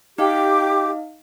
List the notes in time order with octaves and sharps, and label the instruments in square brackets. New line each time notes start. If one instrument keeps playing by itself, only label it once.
[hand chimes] D#4 D#5 F5 [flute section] G4 D6